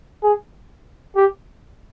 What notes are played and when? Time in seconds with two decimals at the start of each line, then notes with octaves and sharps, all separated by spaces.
0.23 G#4
1.16 G4